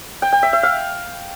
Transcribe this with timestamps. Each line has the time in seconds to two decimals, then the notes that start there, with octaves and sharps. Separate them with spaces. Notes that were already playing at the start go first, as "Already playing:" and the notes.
0.22 G5
0.32 G5
0.43 E5
0.53 E5
0.63 F5